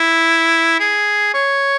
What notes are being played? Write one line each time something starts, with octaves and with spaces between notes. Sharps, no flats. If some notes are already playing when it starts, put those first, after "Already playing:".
Already playing: E4
G#4
C#5